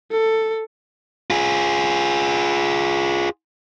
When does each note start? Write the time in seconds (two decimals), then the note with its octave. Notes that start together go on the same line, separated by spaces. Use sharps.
0.12 A4
1.30 F4 G#4